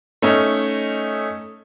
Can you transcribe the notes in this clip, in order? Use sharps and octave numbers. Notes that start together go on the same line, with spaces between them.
A3 C#4 D#4